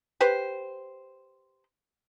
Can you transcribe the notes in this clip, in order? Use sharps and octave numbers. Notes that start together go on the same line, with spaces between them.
G4 B4 C5